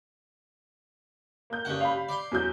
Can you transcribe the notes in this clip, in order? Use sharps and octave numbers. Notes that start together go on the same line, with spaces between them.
A#3 G6
G2 C#3 F#5
F5 B5
D5 C6
E2 F#3 G6